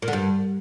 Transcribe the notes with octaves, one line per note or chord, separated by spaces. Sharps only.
A#2
D3
G2